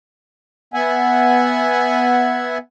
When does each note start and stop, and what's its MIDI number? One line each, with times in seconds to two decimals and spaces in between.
0.74 2.58 59
0.74 2.58 76
0.74 2.58 78
0.74 2.58 80